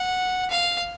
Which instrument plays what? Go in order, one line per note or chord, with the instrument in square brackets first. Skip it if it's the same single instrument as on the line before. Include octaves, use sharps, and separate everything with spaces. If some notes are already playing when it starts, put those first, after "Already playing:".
Already playing: [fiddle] F#5
F5